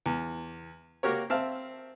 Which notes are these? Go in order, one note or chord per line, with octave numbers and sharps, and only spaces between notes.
E2
A#3 F#4 G4 A#4 C#5
C4 E5 F5 A5 F6